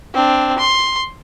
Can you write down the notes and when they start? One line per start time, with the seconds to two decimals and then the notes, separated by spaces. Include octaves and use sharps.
0.14 C4 D4
0.58 C6